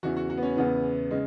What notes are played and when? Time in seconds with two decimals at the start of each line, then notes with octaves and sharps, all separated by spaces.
0.03 E2 C#3 E3 F#4
0.17 F#4
0.30 F#4
0.37 B3
0.43 C#4
0.56 E2 C#3 E3 B3
1.11 C#3 G#3